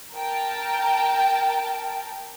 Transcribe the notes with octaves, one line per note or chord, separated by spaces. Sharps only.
A#4 G5 A5